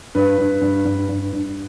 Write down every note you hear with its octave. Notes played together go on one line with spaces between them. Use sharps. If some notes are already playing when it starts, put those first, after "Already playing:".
G2 B4
G2
G2
G2
G2
G2